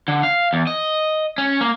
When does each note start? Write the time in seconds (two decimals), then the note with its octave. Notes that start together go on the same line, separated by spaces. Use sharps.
0.08 D3
0.23 F5
0.53 E2
0.67 D#5
1.38 C#4
1.61 A#3